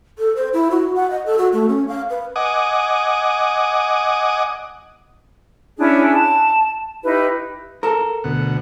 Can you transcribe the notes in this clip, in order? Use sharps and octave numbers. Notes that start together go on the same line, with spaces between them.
A4
C5
E4
F#4
F#5
D#5
A4
F#4
A3
C#4
F5
B4
D#5 F#5 G#5 D6 D#6
C#4 D4 E4 G#4
A5
D#4 E4 G4 B4
A4 A#4
D2 B2 F#5